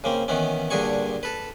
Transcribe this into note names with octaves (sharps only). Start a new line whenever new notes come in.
C#3 A#3 C4
D#3 E3 B3 C#4
G2 A#2 D3 G#4 G#5 C#6
A4 B4